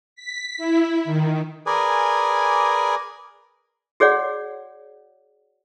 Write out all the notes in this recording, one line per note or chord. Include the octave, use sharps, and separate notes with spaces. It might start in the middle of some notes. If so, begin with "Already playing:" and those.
B6
E4
D#3
G#4 A#4 B4 D5 G#5
F#4 G#4 C#5 D5 F#5